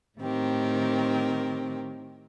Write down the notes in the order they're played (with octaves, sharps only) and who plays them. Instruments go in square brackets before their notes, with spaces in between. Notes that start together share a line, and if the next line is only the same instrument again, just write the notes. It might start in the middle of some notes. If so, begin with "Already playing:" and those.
[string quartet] A2 D#3 C4 G4 A#4